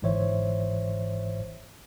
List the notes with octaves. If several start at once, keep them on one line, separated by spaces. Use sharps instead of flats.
G1 G#2 E3 C5 C#5 E5